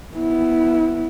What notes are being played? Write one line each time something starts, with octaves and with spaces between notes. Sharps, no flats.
B3 E4